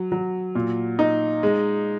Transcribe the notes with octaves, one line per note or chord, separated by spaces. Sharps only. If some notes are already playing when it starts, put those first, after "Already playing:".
Already playing: F#3
F#3
A#2
D#4
G#3